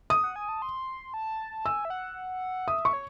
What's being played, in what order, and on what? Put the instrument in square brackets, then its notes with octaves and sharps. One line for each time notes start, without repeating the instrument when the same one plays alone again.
[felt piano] D#6
[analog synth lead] F#5
G#5
A5
C6
A5
[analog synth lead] G#5 [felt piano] E6
[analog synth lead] E5
F#5
[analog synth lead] E5 [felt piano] D#6
[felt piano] C#6
[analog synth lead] C#5